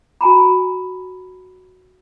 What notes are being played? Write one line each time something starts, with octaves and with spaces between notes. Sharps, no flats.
F#4 G#5 A#5 B5